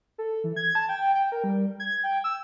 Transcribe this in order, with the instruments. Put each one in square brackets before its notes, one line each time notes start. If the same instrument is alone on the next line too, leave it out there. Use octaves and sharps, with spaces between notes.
[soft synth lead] A4
E3
G#6
A5
G5
G5
A#4
G3
G#6
G5
E6